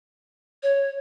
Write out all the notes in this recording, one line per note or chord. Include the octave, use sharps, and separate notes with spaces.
C#5